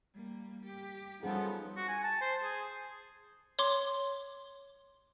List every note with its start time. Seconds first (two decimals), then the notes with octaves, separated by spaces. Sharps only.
0.14 G3 A#3
0.65 G4
1.23 F3 G3 B3 C#4 D#4 G#4 A4
1.77 F#4
1.89 G#5
2.04 A5
2.21 C5
2.44 G#4
3.59 C#5 C6 D6